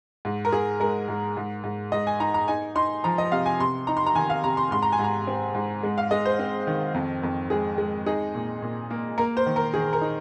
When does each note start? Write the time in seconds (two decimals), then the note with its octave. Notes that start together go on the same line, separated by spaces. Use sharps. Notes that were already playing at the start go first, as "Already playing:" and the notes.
0.25 G#2
0.45 A#4
0.52 G#2 G#4
0.80 G#3 A#4
1.09 G#2
1.37 G#2
1.64 G#2
1.92 G#2 D#5
2.07 G#5
2.20 D#4 A#5
2.34 A#5
2.48 D#4 G#5
2.75 D#4 C6
3.04 F3 A#5
3.18 D#5
3.32 C3 F5
3.46 G#5
3.60 C3 C6
3.87 D#4 A#5
3.97 C6
4.06 A#5
4.15 D#3 G#5
4.30 F5
4.44 C3 A#5
4.57 C6
4.71 G#2 C6
4.82 A#5
4.92 G#5
4.99 G#2 A#5
5.27 C4
5.55 G#2
5.83 G#3
5.98 F5
6.11 G#3 D#5
6.25 C5
6.39 C4
6.67 D#3
6.94 F2
7.23 F2
7.50 G#3 G#4
7.78 G#3
8.06 D#4 G#4
8.35 A#2
8.62 A#2
8.90 A#3
9.18 A#3 A#4
9.37 C5
9.46 D#3
9.56 A#4
9.74 D#3 G#4
9.93 A#4
10.01 D#4